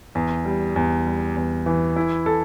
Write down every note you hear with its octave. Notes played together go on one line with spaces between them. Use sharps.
E2
G3
E2
G3
E2
E3
E4
A4